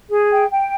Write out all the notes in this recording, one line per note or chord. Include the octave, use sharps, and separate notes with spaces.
G#4
G5
G5